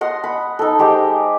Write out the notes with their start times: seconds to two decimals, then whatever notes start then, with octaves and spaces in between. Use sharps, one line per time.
0.01 D#5 F#5 C6
0.24 B5
0.59 D#4 A4
0.79 G#3 G4 C5 G5